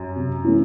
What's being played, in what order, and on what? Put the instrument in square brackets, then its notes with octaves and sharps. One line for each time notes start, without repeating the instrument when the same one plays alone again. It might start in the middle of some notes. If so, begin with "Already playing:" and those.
Already playing: [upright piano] F#2
[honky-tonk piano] C3
E3 A3 C#4 E4